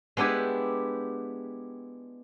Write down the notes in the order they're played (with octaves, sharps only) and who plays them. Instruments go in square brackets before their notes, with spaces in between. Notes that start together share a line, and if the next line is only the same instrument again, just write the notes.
[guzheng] G#3 B3 D4 E4 G4